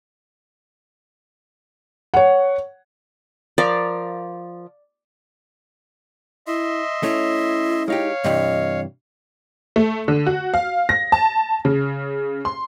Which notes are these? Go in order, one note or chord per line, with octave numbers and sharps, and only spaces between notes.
C#5 F#5
F3 A#4 D5 F5
E4 D#5 E5 C6
A3 C#4 E4
G#3 D#4 G4 C#5 F5
G2 C3 E3 D#5
A3
D3
F#4
F5
A#6
A5
C#3
C6